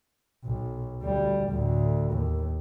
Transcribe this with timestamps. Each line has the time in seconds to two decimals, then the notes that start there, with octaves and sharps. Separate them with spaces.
0.45 B1
1.02 D2 G3
1.49 D2 A2
2.13 D#2